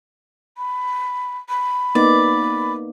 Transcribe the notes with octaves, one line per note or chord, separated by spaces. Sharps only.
B5
B5
A#3 B3 D#4 D5